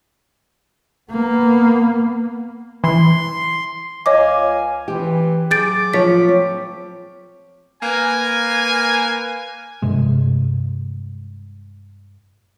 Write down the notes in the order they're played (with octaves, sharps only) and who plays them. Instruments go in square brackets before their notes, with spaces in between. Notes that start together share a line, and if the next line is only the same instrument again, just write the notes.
[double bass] A#3 B3
[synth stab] E3 [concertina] C6
[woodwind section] C#2 F5 G#5 [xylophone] C#5 D#5 D6
[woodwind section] E3 [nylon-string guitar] C4 G4
[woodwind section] F#3 D6 [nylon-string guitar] G#4 [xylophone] G6 A6 D7
[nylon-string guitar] F3 C#5 [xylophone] B6
[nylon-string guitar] C4
[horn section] A#3 A#4 B4 G#5
[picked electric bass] G2 C3 G#3